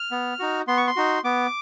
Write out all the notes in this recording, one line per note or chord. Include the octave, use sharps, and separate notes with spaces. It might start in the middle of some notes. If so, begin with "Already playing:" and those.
Already playing: F6
B3
D#4 F#4
B3 C6
C#6
C6
D#4 F#4
B3 D6